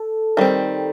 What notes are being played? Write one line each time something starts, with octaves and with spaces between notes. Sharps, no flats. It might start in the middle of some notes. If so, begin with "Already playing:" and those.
Already playing: A4
D#3 G3 C4